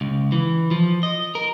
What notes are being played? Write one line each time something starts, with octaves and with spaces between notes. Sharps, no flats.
C#2
E3
F3
D#5
A#4